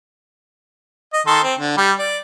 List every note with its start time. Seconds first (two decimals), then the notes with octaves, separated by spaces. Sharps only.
1.13 D#5
1.27 D#3 A4 C6
1.44 C4
1.59 D3
1.77 G3
1.99 D5